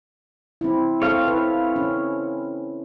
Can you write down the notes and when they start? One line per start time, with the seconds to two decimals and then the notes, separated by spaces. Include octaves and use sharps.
0.61 C4 E4
1.02 C4 A4 C#5 F5
1.28 E4 B4
1.76 C#4